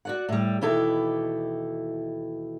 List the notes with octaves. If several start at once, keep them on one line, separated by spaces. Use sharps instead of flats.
F#4 D5 F#5
A2 G3
D#2 B2 E3 E4 G4 A4